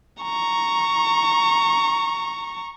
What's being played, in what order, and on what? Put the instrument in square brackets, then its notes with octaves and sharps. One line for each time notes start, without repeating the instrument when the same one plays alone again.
[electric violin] A#5 C#6